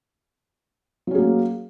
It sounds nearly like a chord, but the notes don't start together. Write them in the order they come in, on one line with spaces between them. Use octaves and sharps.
F#3 C#4 G#4 A#3